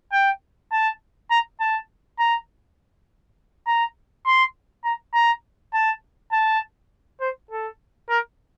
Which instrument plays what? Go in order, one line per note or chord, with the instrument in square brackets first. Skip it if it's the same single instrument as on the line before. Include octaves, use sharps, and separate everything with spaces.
[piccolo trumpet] G5
A5
A#5
A5
A#5
A#5
C6
A#5
A#5
A5
A5
C5
A4
A#4